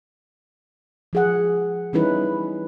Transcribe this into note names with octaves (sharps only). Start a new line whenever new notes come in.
F3 G#4 F#5
E3 G3 C#4 D#4 E4 B4